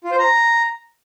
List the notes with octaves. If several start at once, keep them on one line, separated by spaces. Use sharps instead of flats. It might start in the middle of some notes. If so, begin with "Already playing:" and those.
F4
C5
A#5